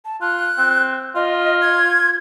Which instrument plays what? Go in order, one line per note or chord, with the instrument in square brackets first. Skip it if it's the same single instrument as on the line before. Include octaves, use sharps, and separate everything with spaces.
[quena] A5
[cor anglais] F4 [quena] F#6
[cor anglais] C4
[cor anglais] F4 [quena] D#5
[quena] G#6